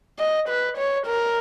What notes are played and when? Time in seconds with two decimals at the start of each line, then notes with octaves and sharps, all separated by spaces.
0.19 D#5
0.49 B4
0.77 C#5
1.06 A#4